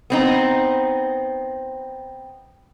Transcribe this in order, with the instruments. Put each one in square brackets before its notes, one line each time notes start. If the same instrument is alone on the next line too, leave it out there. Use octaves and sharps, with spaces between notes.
[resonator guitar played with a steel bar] B3 C4 D#4